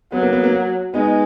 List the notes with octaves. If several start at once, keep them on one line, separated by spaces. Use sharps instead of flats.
F#3 B3
A#3
B3
A#3
G#3 B3 D#4